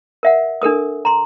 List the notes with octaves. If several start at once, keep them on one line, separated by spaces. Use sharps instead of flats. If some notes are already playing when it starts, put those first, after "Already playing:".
A#4 E5 F#5
D4 A4 A#4 D#6
A#5 C6